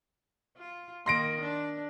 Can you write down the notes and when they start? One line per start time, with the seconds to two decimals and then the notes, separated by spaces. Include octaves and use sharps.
0.57 F4
1.06 D#3 A#3 C6 A#6 D7
1.40 D4